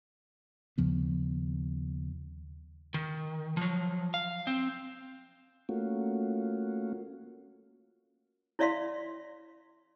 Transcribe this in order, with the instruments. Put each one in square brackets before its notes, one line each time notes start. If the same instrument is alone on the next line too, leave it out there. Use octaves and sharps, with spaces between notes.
[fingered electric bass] D#2 C#3 F3 B3
[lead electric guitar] D#3
F3 F#3
F5
C4
[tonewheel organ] A3 A#3 C#4 F4 F#4
[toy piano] E4 C#5 D5 E5 F5 C6